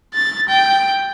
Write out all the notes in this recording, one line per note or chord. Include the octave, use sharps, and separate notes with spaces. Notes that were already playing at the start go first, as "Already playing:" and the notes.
A6
G5